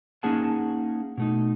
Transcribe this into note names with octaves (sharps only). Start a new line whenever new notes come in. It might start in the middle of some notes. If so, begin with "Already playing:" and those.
A#3 C#4 D#4 G#4 F#5 A5
B2 A3 D#4